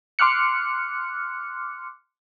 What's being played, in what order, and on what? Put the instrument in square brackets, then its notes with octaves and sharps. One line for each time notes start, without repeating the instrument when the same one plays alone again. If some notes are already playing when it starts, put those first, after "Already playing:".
[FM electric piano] C6 D6 F6 F#6 C#7